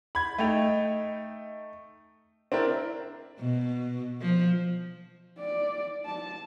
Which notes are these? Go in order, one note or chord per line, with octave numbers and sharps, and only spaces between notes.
B5 G#6
A3 D#4 D#5 G5 F7
C4 D4 E4 A#4
B2
F3
D5
A5